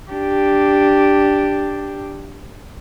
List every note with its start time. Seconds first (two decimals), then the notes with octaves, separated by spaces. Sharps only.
0.11 D4 G4